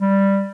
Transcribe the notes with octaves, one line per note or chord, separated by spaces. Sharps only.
G3